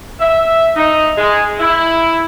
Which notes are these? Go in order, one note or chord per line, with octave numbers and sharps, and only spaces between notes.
E5
D#4
G#3
E4